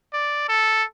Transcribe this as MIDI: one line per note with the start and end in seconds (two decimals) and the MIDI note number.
0.13 0.45 74
0.49 0.83 69